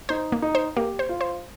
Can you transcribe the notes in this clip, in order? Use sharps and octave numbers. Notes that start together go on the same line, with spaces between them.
D#4 C5
A#3
D#4
C5
A#3 G4
C5
F4
C5